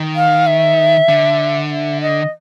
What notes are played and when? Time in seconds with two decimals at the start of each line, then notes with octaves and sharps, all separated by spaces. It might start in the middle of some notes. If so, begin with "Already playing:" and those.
Already playing: D#3
0.16 F5
0.47 E5
1.09 D3
1.71 E5
2.01 D#5